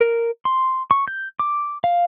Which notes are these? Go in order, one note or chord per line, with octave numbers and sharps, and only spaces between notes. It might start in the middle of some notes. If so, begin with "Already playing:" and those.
A#4
C6
C#6
G6
D6
F5